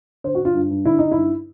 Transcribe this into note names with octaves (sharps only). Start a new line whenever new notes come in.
D3 C5
F#4
D3
F4
G2
G2
D3 E4
D3 D#4
G2 E4